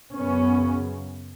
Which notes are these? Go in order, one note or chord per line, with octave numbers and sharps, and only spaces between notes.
F#2 C#3 B3 C#4